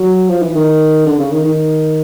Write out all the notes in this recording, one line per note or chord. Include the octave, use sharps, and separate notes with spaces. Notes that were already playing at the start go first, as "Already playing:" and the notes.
Already playing: F#3
F3
E3
D#3
D3
C#3
D#3
D#3